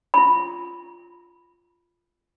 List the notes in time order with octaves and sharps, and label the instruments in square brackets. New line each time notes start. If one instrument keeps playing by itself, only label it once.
[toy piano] F4 B5